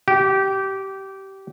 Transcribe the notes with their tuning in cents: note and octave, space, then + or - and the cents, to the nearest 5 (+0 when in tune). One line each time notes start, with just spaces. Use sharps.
G4 -20